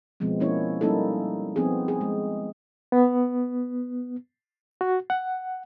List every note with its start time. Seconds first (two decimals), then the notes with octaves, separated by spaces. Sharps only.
0.20 B2 F3 G#3 B3 C4
0.40 F3 A#3 C#4 E4 C#5
0.81 G3 A#3 C#4 D#4 E4 A4
1.56 F3 B3 C4 D#4 G#4
1.88 G#4
2.01 G#3
2.92 B3
4.81 F#4
5.10 F#5